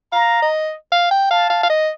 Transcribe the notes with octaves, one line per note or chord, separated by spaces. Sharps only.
F5 A#5
D#5
F5
G5
F5 A5
F5
F5
D#5